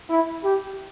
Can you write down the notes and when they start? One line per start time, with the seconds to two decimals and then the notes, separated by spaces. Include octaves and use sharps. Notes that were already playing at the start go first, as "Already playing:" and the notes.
0.09 E4
0.44 G4